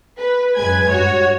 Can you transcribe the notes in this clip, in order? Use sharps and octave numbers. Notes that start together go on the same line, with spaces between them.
B4
F#2 G#3 B4 G#5 G#6
G2 F#4 C#5